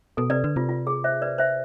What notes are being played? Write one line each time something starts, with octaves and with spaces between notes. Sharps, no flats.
B2 A4
C3 B4 D5
D3 B4
C3 F4
F4
G#4
C5 E5
B4 D5
C5 E5